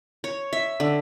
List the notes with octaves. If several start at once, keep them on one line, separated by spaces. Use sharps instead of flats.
C#5
E5
D3